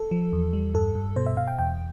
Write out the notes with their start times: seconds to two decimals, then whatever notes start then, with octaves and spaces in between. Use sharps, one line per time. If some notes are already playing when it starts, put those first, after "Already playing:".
Already playing: A4
0.11 F3
0.33 E2
0.53 G3
0.74 G2 A4
0.95 G2
1.16 B2 C5
1.26 E5
1.37 B2 F5
1.48 G5
1.59 E2 G5